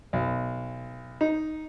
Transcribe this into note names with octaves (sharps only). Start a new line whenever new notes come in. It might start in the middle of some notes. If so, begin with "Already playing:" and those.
B1
D#4